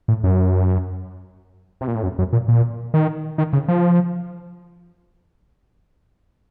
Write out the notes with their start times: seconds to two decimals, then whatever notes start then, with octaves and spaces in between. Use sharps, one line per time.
0.08 A2
0.24 F#2
1.81 C3
1.88 A#2
1.95 A2
2.03 F#2
2.19 F#2
2.33 A#2
2.48 A#2
2.94 D#3
3.38 D#3
3.53 C#3
3.68 F3